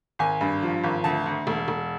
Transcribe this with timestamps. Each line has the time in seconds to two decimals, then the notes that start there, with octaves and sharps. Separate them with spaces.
0.19 G#1 G#5
0.41 G2
0.62 F3
0.84 G#1
1.04 D2 A5
1.26 D2
1.47 E1
1.68 E1